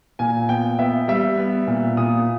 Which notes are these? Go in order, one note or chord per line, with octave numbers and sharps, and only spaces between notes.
A#2 G#5
B3 G5
B3 E5
G3 E5
B3
A#2
A#2 D#6